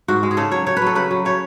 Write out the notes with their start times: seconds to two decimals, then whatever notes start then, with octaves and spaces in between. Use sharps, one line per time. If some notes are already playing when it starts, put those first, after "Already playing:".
0.08 G#2 F#4
0.23 G#3
0.31 G#4
0.37 C#3 A4
0.51 F#3 C#5
0.66 C#3 C#5
0.77 B4
0.82 F#3 A4
0.95 C#3 B4
1.11 F#3
1.25 C#3 C#5